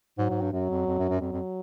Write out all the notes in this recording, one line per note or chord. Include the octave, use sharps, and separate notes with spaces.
G#2 F#3
G#2
G2
F#2 F#3
F2
F2
F#2
F#2
F2 F#3
F2